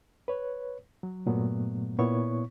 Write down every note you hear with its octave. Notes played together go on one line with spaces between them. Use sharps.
B4 C#5
F#3
G2 A#2 F#3 A3 B3
A#2 B3 E4 C#5 C#6